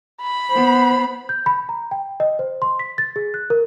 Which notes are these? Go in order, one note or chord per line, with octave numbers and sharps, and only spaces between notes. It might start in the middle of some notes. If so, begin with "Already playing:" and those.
B5
B3 C5
G6
B5
A#5
G5
D#5
C5
C6
B6
A6
G#4
F#6
A#4